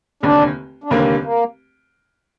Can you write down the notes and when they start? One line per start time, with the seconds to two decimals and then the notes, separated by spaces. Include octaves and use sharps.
0.23 F1 D#2 D3 D4
0.84 D4
0.90 F1 D#2 D3 G3 A#3 C4
1.24 A#3